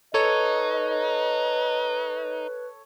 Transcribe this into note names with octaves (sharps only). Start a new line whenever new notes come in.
D#4 A4 B4 C#5 D#5